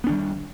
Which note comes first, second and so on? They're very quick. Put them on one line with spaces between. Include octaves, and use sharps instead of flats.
B3 D4 D#3 G3